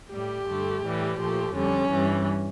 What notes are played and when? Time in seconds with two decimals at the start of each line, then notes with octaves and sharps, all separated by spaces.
0.11 A2 G3 G4
0.47 G2 D3 A3
0.83 A2 E3 G3
1.18 A#2 F3 A3 G4
1.53 F2 D3 G3 C#4
1.89 G2 E3 G3